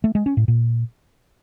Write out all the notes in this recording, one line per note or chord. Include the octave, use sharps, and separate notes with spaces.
A3
G#3
C#4
A2
A#2